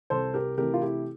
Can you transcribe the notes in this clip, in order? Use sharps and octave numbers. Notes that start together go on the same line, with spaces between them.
C2 A4 C5
G4 A#4
C3 E3 A3 G4 A#4
F4
E4 G4